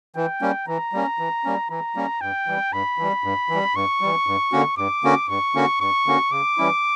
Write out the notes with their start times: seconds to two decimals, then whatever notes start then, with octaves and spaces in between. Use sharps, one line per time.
0.16 E3 G5
0.41 G3 A#3 C#4
0.68 E3 A#5
0.93 G3 A#3 C#4
1.19 E3
1.44 G3 A#3 C#4
1.70 E3 A#5
1.96 G3 A#3 C#4
2.21 G2 G5
2.47 E3 G3
2.73 G2 B5
2.98 E3 G3
3.24 G2
3.49 E3
3.54 G3
3.75 G2 C#6
4.01 E3 G3
4.26 G2
4.52 D3 A#3 C#4 F#4
4.78 G2 D6
5.04 D3 A#3 C#4 F#4
5.29 G2 C#6
5.55 D3 A#3 C#4 F#4
5.80 G2 C#6
6.06 D3 A#3 C#4 F#4
6.32 C#3 D6
6.58 E3 G3 C#4 E4